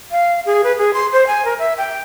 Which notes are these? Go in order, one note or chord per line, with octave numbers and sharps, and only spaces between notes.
F5
G#4
B4
G#4
C6
C5
G#5
A#4
E5
G5